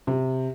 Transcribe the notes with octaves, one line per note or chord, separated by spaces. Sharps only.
C3